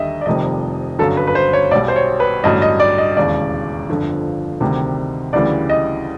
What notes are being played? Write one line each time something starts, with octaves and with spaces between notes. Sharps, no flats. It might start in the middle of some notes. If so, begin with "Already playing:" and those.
Already playing: D#2 D3 G3 D#5 E5
D5
F1 F2 C3 D#3 G3 D#5
G1 F#2 D3 F#3 A4
B4
B4
C5
C#5
B1 B2 G3 D5
C5
C#5
B4
A1 G2 D3 F#3 D#5
D#5
D5
D#5
E1 D#2 C#3 D5
G1 F2 D3 F3
D2 C3 D#3 G3
D2 C#3 E3 G3 D5
D#5